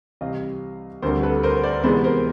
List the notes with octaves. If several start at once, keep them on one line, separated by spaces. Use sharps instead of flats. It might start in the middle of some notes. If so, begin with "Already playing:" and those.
C2 C3 E3 G3 C4 D#5 F5
D2 D3 G3 C4 A#4 C5
A4 B4
A#4 C5
C5 D5
C3 E3 G#3 B3 C5 D5
A#4 C5